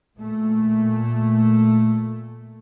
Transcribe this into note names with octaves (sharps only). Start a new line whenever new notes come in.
A#2 A3